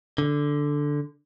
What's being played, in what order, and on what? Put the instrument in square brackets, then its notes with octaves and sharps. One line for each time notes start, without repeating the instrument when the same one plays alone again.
[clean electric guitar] D3